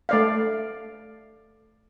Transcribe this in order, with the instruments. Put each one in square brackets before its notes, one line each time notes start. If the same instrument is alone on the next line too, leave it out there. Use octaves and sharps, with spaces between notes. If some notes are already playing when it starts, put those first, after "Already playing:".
[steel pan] A3 D5 F5